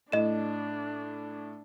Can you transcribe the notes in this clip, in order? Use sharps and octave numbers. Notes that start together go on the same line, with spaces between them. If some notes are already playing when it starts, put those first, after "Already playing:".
A2 D4 D#5 E7